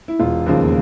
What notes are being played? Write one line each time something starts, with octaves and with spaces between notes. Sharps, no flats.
E4
E1 F4
D#2 C#3 F3 A#3